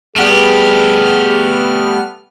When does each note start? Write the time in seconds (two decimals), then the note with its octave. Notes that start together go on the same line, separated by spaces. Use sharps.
0.16 G3 A3 B3 G4 G#4 F6